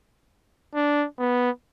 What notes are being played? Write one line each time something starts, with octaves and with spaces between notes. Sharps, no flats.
D4
B3